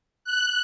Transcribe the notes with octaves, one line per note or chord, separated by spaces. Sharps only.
F#6